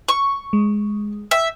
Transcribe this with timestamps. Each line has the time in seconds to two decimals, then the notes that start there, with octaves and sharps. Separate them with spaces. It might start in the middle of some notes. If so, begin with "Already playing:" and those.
0.09 C#6
0.53 G#3
1.31 E5 G5